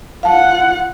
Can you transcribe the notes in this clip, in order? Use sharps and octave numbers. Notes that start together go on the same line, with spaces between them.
F4 F5 F#5 A5